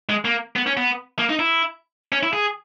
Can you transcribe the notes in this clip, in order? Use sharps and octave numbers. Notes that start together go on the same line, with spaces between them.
G#3
A#3
B3
C#4
B3
A#3
D#4
E4
C#4
E4
G#4